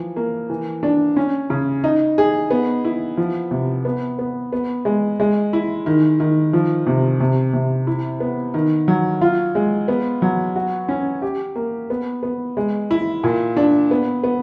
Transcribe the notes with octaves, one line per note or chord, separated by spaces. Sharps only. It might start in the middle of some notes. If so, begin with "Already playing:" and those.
Already playing: E3 F3
A#3
E3
D4
C#4
C#3
D#4
G#4
B3
E4
F3
C3
B3
B3
B3
G#3
G#3
E4
D#3
D#3
F3
C3
C3
C3
E4
B3
D#3
F#3
F4
G#3
B3
F#3
F#4
C#4
G4
A#3
B3
B3
G#3
E4
A#2
D4
B3
B3